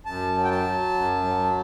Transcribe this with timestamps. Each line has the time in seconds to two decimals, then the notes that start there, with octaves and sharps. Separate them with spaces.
0.05 F#2 A5
0.35 F#3
0.44 G5
0.50 A5
0.65 F#3
0.94 F#2
1.24 F#3